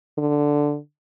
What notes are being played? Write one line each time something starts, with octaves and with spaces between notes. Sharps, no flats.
D3